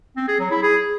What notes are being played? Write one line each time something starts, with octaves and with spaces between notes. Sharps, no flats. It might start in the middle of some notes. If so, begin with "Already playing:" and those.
C4
G#4
F#3
E4
G#4